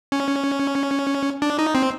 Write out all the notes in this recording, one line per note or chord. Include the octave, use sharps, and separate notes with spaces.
C#4
D4
D#4
C4